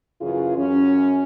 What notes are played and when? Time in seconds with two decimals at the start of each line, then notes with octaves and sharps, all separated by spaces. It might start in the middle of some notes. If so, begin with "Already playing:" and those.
0.21 F#2 C#3 E3 F4 G#4
0.57 F#2 C#4